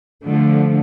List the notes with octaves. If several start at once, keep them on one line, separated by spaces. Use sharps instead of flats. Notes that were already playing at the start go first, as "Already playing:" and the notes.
D3 F3 A3